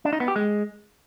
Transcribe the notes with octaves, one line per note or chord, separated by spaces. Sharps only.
D4
D#4
B3
G4
G#3